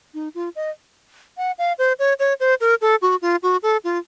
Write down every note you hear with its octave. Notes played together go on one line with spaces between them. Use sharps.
D#4
F4
D#5
F#5
F5
C5
C#5
C#5
C5
A#4
A4
F#4
F4
F#4
A4
F4